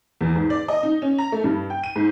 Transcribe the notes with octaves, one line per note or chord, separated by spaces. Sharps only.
E2
G#2
D5
D#5
D#4
C#4
A#5
A3
G2
G5
D#7
G#2